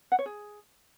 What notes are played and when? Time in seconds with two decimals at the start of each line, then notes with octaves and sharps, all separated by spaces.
0.12 F#5
0.19 C#5
0.26 G#4